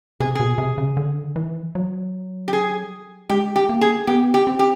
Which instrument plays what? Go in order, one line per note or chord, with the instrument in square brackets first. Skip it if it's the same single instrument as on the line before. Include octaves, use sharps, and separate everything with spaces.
[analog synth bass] C3 [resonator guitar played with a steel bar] G#4
[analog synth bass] B2 [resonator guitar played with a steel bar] G#4
[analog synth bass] C3
C#3
D3
E3
F#3
[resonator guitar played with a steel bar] G4
G#4
[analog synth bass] G#3 [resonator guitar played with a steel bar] G4
[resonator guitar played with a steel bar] G4
[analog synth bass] A#3
[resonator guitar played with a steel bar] G#4
[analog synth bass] B3 [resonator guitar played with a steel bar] G4
[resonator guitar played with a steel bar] G4
[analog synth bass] C4
[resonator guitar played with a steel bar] G4